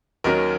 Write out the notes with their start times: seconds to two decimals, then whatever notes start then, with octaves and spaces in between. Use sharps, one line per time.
0.24 D#2 D#3 F#3 C#4 A#4